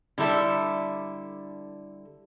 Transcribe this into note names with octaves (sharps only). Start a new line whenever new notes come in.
D3 G3 E4 A4 E5